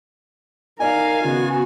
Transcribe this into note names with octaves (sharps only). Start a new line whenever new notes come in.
D#4 A#4 D5 D#5 F5 G#5
C#3 B3 F#4